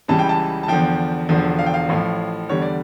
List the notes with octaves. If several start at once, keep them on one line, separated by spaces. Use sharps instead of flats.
C#2 C#3 E3 G3 A5
G5
A5
A5
E2 D3 F3 G5
E1 E2 D3 F3
F5
G5
F5
A1 A2 F3
E2 D3 G3 C#5
D5